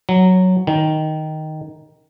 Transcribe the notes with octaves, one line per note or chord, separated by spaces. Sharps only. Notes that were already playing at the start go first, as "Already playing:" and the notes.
F#3
D#3